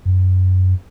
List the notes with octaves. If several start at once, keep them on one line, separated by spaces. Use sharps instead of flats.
F#2